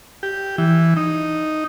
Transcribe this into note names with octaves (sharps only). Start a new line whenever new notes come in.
G4
E3
D#4